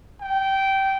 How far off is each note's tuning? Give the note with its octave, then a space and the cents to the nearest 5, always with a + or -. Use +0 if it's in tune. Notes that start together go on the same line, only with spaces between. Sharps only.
G5 -15